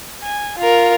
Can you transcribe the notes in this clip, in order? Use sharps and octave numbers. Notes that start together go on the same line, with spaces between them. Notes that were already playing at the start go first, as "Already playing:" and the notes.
G#5
F4 A#4